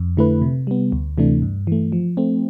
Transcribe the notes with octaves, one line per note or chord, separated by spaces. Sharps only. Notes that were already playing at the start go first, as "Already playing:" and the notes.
Already playing: F2
D3 A3 E4 B4
C3
G3 B3
D2
C3 E3 A3 D4
G2
E3 A3
F3
A3 C4